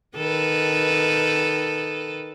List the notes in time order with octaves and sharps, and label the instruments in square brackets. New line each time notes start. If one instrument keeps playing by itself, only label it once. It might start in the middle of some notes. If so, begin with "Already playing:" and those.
[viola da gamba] D#3 A4 B4